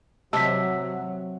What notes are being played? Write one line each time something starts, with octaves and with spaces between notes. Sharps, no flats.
C3 F#3 C5 D#5 A5 E6 B6